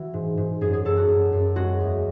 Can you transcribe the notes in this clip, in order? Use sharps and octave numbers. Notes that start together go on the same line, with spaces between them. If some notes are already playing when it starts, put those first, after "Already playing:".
Already playing: E3 F#4
G#2
G#2
F#2 G#4
G#4
F#2 A4
F#4
F#2
F#2
G#3 F#4
E2